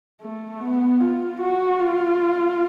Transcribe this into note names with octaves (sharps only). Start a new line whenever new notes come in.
A3
B3
F4
F#4
F4